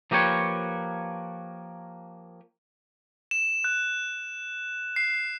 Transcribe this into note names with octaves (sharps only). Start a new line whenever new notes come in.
F3 A#3 G4 B4 C#5
E7
F#6
C7